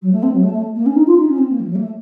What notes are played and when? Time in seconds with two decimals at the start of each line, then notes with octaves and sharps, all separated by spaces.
0.02 F#3
0.12 A3
0.22 C4
0.33 F#3
0.43 A3
0.54 A3
0.75 A#3
0.86 C#4
0.96 D#4
1.07 F4
1.17 D#4
1.28 C#4
1.38 C4
1.49 A#3
1.59 F3
1.70 F#3
1.75 A#3
1.80 A3